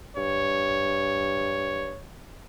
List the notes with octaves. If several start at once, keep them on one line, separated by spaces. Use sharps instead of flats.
G2 C#5